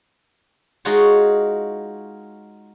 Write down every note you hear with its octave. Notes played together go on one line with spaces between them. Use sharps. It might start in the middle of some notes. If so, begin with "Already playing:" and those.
G#3 D#4 F4 F#4 C#5